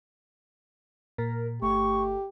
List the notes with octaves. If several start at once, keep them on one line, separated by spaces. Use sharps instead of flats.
A#2 A#4
G1 A3 G4 C#6